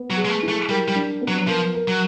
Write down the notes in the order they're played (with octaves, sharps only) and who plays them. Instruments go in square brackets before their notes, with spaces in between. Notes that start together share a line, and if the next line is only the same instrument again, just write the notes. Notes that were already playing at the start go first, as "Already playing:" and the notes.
Already playing: [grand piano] B3
[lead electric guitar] F#3
[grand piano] G#4
[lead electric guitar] G#3
A3
[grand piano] E4
[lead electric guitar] A3
[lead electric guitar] G3 [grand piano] A#4
[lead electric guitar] G3
[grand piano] D4
B3
[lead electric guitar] F#3
[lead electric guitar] F3 [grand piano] A#4
[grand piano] A#4
[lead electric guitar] F#3